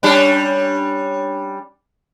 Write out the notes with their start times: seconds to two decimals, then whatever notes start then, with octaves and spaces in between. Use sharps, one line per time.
0.03 G3 C#4 D4